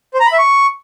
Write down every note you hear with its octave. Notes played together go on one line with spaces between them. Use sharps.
C5
A#5
B5
E5
C#6